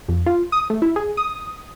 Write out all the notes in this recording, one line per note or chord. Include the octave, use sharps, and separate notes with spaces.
F2
F4
D#6
A3
E4
G#4
D#6